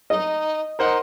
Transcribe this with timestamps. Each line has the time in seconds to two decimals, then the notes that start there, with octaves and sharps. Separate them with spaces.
0.10 D#4 D#5
0.79 D#4 A#4 C5 F#5